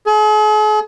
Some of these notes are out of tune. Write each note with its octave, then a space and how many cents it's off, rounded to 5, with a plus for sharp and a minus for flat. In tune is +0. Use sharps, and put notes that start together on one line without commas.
G#4 +45